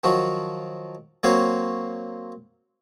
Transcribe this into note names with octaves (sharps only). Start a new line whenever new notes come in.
D#3 F3 F#3 F#4
F#3 A#3 C4 F#4 C5 C#5